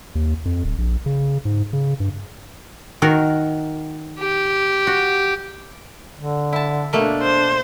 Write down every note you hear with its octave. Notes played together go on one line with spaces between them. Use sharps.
D#2
F2
D1
A#1
C#3
G#2
C#3
G2
D#3 F#4 A#4
G4
F#4
D3
E4 A5
B2 A3 A#3 D4
C5